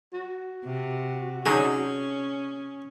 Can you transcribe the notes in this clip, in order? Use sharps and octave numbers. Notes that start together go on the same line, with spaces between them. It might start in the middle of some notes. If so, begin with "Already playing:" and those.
F#4
C3
D3 F#3 C#4 D#4 G#4